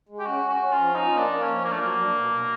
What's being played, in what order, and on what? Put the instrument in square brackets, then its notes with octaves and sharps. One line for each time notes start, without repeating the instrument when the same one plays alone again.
[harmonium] G#3
[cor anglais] G4
[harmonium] C#4 [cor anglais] F#4
[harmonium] C#4
[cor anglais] F#4
[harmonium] C#4
[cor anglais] F4
[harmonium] F3
[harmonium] C#4 [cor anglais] D#4
[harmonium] A#3
[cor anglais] D4
[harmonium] A#3
[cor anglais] C#4
[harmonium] F3
[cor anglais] A#3 [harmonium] D4
[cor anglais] A3
[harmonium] F#3 [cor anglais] A#3
[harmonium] D4
B2
B2